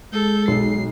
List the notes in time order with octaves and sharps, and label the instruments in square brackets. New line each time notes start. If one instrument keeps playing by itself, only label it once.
[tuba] G#3 [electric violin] A4 G6
[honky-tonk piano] B1 [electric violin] C7